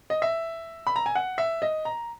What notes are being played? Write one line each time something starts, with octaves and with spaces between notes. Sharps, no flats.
D#5
E5
B5
A#5
G#5
F#5
E5
D#5
A#5